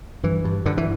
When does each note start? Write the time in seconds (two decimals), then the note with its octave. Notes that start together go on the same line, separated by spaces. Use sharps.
0.24 G2 E3
0.45 G2
0.66 G2 D3
0.77 E3